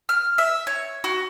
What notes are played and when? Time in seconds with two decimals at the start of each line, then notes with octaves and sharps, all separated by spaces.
0.09 F6
0.38 E5
0.67 C#5
1.04 F#4